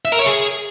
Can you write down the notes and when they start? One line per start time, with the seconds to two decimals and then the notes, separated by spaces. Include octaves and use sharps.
0.05 E5
0.12 A#4
0.19 C#5
0.26 G#4